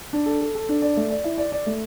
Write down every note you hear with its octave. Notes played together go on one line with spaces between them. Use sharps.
D4
A4
A4
A4
D4
D5
A3
D5
E4
D5
D5
A3